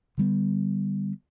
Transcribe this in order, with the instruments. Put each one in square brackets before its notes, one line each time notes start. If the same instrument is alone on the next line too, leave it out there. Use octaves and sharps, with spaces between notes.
[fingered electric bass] D3 G3 B3